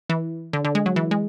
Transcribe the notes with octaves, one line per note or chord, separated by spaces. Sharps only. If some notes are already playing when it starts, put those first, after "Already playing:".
E3
D3
D3
G#3
F#3
E3
G#3